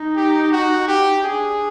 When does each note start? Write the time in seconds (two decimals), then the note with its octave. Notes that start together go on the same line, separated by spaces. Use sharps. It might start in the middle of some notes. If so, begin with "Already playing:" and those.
Already playing: D#4
0.16 G4
0.52 F#4
0.88 G4
1.23 D4 G#4